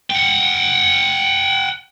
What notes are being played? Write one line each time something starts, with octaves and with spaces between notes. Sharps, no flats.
F#5 G5